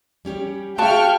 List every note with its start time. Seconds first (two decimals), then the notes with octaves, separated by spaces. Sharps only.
0.25 G3 C#4 G4
0.78 F#4 G#4 E5 F5 G5 A5 C#6 F6